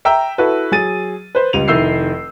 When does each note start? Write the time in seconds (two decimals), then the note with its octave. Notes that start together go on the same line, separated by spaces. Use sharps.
0.05 E5 G5 A#5 E6
0.38 E4 F#4 A4 B4
0.72 F#3 G#4 A6 D#7
1.35 B4 C5
1.53 C#2 G3 D#7 F7
1.68 F1 D#3 E4 E6 G6 C7